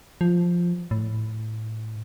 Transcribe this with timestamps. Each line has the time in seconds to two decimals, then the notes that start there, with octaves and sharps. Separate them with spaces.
0.21 F3
0.91 A2